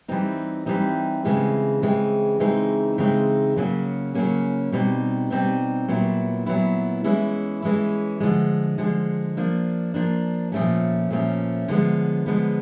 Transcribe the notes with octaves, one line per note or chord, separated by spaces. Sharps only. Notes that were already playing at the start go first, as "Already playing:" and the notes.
E3 G3 C4 D#4
E3 G3 C4 D#4
C#3 E3 G#3 C4
C#3 E3 G#3 C4
C#3 E3 G#3 C4 D#4
C#3 E3 G#3 C4 D#4
C#3 F#3 A#3 C#4
C#3 F#3 A#3 C#4
B2 G3 C4 D#4
B2 G3 C4 D#4
A#2 F#3 B3 E4
A#2 F#3 B3 E4
E3 G#3 C#4 E4
E3 G#3 C#4 E4
D3 F3 G#3
D3 F3 G#3
F3 A#3 D4
F3 A#3 D4
A#2 F3 A3 C#4
A#2 F3 A3 C#4
D3 F3 G#3 B3
D3 F3 G#3 B3